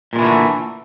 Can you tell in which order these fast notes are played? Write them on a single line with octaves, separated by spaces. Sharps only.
A#2 G#3 E3 D3 A3